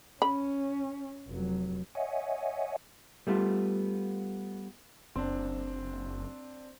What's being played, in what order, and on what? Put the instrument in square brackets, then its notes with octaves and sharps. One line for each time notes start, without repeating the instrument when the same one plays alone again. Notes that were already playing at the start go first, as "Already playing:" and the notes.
[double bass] C#4 [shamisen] B5
[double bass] F1 F#3
[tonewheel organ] C#5 D#5 E5 F#5 G#5
[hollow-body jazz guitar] G3 A3 B3 F4
[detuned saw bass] F#1 [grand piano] C4 D4